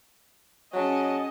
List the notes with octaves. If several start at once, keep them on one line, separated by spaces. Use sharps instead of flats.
F#3 C#4 G#4 D#5 A5